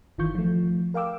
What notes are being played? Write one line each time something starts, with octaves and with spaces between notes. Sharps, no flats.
G1 D#3 E3 F4 C#6 G6
F3 A3
A#4 F5 G5 D6 E6